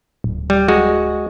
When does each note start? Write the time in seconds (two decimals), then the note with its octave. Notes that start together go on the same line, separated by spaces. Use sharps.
0.24 D1
0.50 G3
0.68 G#3 F#4